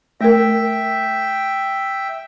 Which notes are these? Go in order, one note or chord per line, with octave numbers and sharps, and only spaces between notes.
A3 A#4 E5 G5